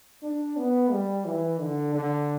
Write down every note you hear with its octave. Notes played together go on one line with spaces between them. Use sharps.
D4
B3
G3
E3
D3
D3